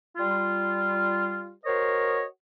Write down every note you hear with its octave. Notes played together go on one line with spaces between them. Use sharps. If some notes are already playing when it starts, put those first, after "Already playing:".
G3 F4
F#4 A#4 C5 C#5 D#5